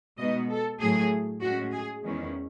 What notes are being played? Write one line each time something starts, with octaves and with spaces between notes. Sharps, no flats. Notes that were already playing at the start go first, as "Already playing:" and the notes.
B2 G#3 B3 D#4 D#5
A4
A2 F#3 A3 G#4
A2 G#3 C#4 F#4
G#4
E2 D#3 G#3 C#4 E4